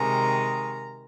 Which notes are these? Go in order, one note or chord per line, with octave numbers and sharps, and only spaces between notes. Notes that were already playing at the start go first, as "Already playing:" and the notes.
Already playing: C3 D#3 G#3 A#5